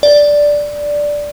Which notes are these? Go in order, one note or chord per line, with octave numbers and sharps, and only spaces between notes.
D5